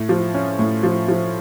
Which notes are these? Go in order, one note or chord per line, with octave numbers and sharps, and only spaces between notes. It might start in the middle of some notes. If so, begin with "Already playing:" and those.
Already playing: A2
F3
C#4
A2
F3
F3